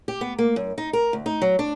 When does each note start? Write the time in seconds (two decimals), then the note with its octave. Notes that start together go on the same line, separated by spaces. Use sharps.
0.08 G4
0.21 B3
0.38 A#3
0.56 F#2
0.78 D#4
0.93 A#4
1.13 D2
1.26 D#4
1.42 F#3
1.59 D4